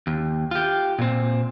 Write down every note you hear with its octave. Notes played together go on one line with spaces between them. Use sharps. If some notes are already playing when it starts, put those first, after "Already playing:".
D#2
F4 G4
A#2 C4